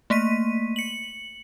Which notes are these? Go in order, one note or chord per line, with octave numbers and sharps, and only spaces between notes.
A3 A#3 B6 D#7
C#7 F#7